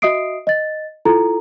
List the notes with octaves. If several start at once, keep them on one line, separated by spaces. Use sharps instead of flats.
F#4 D#5 E5 D#6 C7 D7
D#5 A6
E4 F4 A4 A#5